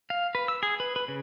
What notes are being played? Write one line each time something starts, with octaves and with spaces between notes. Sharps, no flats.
F5
B4
E6
G#4
B4
B4
C#3